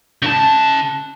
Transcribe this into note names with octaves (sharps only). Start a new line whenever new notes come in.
C#3 A5